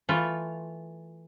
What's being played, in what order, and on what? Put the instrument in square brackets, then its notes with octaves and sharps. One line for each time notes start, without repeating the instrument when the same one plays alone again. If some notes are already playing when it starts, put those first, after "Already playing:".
[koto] E3 A3 F4